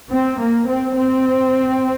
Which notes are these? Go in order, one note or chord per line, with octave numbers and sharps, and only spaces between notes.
C4
A#3
C4
C4